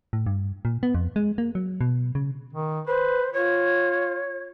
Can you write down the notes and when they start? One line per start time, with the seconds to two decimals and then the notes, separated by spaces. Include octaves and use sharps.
0.13 A2
0.26 G2
0.65 A#2
0.83 B3
0.95 F2
1.16 G#3
1.38 A#3
1.55 F#3
1.81 B2
2.15 C#3
2.53 D#3
2.87 B4 C5
3.33 F4 C#5